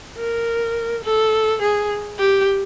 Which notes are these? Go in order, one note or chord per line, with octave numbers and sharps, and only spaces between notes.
A#4
A4
G#4
G4